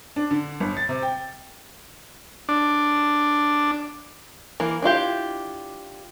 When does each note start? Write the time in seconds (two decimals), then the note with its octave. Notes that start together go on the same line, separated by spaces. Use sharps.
0.16 D4
0.31 D3
0.60 G1
0.77 A6
0.89 C3
1.02 G5
2.49 D4
4.60 E3 A#3
4.82 D4 E4 F4 G4